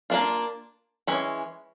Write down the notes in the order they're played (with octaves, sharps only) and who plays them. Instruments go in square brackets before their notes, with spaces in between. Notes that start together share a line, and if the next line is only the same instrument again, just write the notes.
[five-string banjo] A#3 D4 F4
E3 G#3 C#4